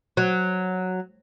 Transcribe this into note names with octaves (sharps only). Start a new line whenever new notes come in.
F#3